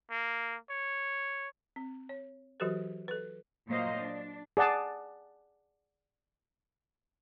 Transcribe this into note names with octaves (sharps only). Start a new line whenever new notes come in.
A#3
C#5
C4
C#5
E3 F#3 F#4 G4 A4 B4
A4 B4
A#2 F#3 A#3 C5 D#5 F5
D4
G#4 D5 F#5 A5